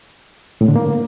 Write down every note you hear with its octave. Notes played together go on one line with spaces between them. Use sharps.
A2
D3
A#3